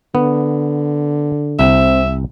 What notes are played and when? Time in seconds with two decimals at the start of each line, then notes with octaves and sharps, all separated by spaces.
0.15 D3 B3
1.59 C2 C4 E5